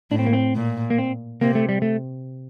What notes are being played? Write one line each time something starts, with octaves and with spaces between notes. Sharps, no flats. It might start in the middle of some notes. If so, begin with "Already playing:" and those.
A2 D4
C4
A#3
C4
A#2
A#3
C4
C3 A#3
A3
G3
A3